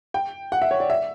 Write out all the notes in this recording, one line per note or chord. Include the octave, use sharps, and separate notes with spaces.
G5
F#5
E5
C#5
D5
E5